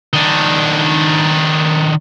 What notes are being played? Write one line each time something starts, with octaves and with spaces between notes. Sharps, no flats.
D#3 D4